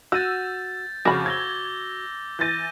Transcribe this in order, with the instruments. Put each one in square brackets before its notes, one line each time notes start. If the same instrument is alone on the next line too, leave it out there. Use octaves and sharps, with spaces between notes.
[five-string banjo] F#4 [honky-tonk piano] E6 D#7 [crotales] G6 A6
[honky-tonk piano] F2 C#3 [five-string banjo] F#4 B5 [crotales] D6 G6
[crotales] E6 A#6 G7 [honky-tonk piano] G#6
[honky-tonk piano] E3 A6 [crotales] G6 A#6 D#7